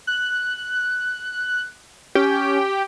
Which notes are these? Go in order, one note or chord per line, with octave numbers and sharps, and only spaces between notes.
F#6
C#4 G4